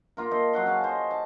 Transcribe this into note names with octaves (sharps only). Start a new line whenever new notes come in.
A#3 F4 A#4
A4 C5 D#5
F#3 F#5 C6
C#3 F5 G#5 A5
C5 D#5
A5